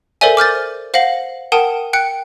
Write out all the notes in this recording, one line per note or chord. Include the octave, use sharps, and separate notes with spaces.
A4 A#4 C5 D5 E5 G#5
D6 F6 G6 A6
C5
C5 F5 F#5 A#6 F#7
A#4 F#5 G5 A5 D#6 D#7
G5 F#6 C#7